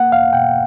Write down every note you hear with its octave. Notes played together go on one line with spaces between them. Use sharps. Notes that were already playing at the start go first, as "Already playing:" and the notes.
Already playing: A#3 F#5
E2 F5
B2 G5